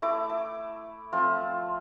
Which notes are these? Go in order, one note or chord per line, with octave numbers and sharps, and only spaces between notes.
A3 E4 D6
D6
F3 A3 C4 F4